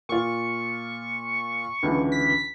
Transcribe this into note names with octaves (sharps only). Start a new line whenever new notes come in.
A#2 F4 C#6
C#2 D3 E3
B6